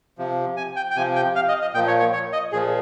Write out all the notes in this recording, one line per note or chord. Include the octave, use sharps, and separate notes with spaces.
C3 F3
G#5
G5
G5
C3 F3 G#5
G5
F5
D#5
D#5
A#2 F3 G5
C#5
C#5
C#5
D#5
A#2 F3 G#4